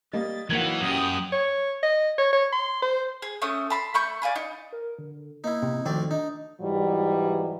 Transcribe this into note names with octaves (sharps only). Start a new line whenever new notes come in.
G3 A#3 D#5 A6
D#3 E3 F#3 A#3 F#5 G#6 C#7
F#2 G4 D#6
C#5
D#5
C#5
C#5
C6
C5
G#4
A3 C#4 D#6
A5 B5 C6
A3 B5 C#6 G6
D5 F5 G#5 B5
D#4
A#4
D3
A#3 D#4 E4
C3
D2 D#3 F3 C4 D5
D4 D#4
G#2 E3 F#3 G3